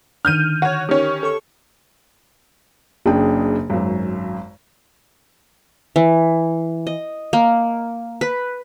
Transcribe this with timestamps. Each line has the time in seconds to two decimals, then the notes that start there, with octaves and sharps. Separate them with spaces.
0.25 D3 D#3 F6 G6 D#7
0.62 F#4 C#5
0.89 D#3 C#4 G4 C#5
1.23 A4 C#5 C#6
3.06 F#1 C#3 D4 G#4 G5
3.70 G#1 F#2
5.96 E3
6.87 D#5
7.33 A#3
8.21 B4